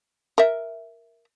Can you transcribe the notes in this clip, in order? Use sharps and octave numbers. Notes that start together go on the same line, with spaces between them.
A#4 E5